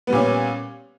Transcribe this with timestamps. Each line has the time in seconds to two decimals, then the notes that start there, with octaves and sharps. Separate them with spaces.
0.07 B3
0.10 G3
0.13 A#2
0.15 C#4